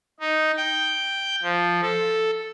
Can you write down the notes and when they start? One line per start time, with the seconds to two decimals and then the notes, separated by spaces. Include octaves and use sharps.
0.20 D#4
0.57 G5
1.43 F3
1.81 A4